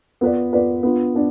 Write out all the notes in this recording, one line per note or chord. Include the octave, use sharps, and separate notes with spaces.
B3 F4 B4 D5
B3 F4 B4 D5
B3 D4 F4
B3 D4